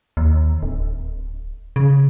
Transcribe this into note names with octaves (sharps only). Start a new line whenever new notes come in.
D#2
D1
C#3